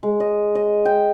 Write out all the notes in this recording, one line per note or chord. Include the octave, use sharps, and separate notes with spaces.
G#3
D#5
D#5
G5